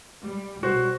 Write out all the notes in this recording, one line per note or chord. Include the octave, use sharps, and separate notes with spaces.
G3
B2 G3 F#4 C5